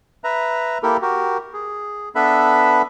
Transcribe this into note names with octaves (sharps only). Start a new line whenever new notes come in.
B4 E5 A#5
A#3 E4 G4 A4 A#4
F#4 G4 A#4
G#4
B3 D4 A4 B4 E5 B5